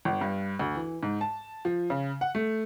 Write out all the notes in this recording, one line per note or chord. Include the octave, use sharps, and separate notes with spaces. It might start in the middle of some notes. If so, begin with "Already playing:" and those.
G1
G2
D2
E3
G#2
A5
F3
C#3
F#5
A3